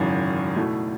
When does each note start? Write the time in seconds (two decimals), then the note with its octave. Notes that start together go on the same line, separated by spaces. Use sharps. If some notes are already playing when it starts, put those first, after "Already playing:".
Already playing: G#1 F#2 C#3 E3
0.55 B2 A3 E4